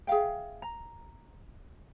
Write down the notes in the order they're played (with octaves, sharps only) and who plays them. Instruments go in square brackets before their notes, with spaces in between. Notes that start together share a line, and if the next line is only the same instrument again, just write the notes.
[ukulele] G#4 E5 F5 G5
A#5